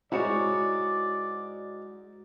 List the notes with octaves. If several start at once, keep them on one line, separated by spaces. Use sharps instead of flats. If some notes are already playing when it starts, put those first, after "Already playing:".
G#2 E4 F#4 C#5 D5